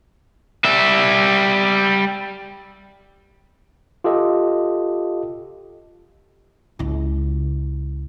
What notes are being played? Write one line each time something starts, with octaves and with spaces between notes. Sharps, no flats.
G3 E5
F4 G4 A4 D#5
C#2 E4